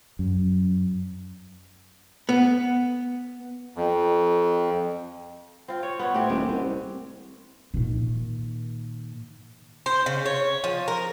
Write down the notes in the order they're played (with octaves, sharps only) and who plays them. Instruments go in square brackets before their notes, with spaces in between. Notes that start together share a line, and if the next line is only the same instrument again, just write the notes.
[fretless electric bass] F#2
[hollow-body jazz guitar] B3
[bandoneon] F2
[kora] C4 F4
C#5
B3 C#5
[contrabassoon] A2 [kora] C4 G4
[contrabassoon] D#1 [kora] G#3
[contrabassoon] C2
[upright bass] A#2 D#3
[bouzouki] C5
C#3
C#5
F3
A#4